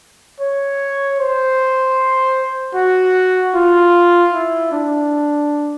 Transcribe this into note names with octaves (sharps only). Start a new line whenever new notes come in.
C#5
C5
F#4
F4
E4
D4